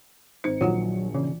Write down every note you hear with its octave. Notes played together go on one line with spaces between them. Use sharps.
G#1 D#4 C5 C#7
A#1 D#3 F#3 F4 F#4 F#5
C#3 E3